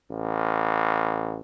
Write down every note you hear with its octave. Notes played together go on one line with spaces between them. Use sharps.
A1